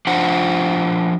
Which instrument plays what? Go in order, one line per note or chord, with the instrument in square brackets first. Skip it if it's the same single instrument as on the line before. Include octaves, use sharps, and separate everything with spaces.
[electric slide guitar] F3 D4 F4 C5 F#5